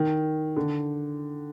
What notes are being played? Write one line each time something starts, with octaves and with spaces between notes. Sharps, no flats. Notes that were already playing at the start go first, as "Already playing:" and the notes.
Already playing: D#3
D3